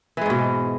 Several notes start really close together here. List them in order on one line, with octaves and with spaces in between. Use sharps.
E3 G#3 G#2 B2